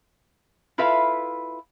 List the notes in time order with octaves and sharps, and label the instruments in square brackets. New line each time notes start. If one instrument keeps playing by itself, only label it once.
[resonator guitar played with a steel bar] E4 F4 A4 B4 E5 F5